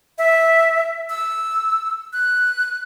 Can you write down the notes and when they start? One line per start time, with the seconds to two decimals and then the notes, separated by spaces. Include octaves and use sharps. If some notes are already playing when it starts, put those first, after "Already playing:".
0.18 E5
1.09 E6
2.13 F#6